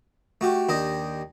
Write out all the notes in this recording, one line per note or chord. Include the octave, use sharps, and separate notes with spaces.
A3 F#4 G4
D#2 D4 G4 D#5